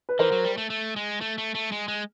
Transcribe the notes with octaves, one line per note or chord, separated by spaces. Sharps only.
B4
E3 A#4 C5
F#3
G3
A3
A3
G#3
A3
A3
A3
G#3
G#3